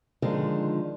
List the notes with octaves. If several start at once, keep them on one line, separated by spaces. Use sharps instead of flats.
D3 D#3 F3 G#3